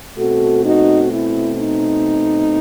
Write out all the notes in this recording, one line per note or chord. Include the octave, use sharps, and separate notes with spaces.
B2 A3 C4 F#4 A4
D#4 F#4
E4
D#4